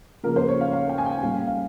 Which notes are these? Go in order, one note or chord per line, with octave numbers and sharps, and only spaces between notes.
C#3 F3 A#3 A#4
C5
C#5
F5
F5
G5
G#5
G5
A#2 G3 C#4 F5
F5